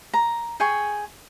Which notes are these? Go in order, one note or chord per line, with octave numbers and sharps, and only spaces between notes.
A#5
G#4 G5 G#5 C#6